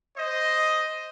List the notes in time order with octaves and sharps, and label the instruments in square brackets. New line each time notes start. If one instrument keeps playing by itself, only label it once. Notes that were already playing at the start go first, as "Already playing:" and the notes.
[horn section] C5 D#5